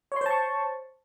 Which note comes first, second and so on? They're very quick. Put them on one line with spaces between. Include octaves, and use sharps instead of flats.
C#5 C6 C5 A5 C#6